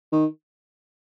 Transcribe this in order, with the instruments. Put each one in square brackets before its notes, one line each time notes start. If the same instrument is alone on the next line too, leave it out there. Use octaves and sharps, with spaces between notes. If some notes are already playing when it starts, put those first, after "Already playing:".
[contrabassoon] D#3